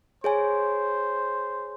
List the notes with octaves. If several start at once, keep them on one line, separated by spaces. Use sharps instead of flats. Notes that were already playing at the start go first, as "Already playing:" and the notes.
G#4 C5 C#5 G#5